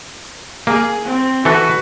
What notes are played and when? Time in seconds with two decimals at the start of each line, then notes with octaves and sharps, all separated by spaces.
0.67 A#3 G#4
1.05 C4
1.45 E3 F#4 A4 B4